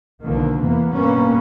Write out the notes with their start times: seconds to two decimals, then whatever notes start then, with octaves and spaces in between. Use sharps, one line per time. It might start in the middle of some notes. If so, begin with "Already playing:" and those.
0.23 B1 D3 D#3 F3 A#3
0.61 E2 C3 E3 A#3 B3
0.93 G2 B2 G3 A#3 B3 C#4